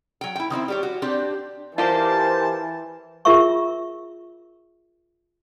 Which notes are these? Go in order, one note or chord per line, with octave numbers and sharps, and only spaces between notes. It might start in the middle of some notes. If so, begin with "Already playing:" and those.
F#3 G5
E4 G5
D#3 C4 D#4 E4
G3 G4 C#5
F#4
C4 D4 G4
E3 F4 G4 A#4 C5 D5 G5 A5
F4 G#4 A#4 E5 C#6